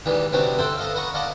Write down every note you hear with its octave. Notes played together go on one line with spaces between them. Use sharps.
A#2 D#3 E3 G3 G#3
C3 G3 B3 C4 D4 F#4
A4 C5 E5 F#5 G5
A4 D#5 F5
B4 D#5 F#5 A#5 C#6
D5 D#5 F5 F#5 A5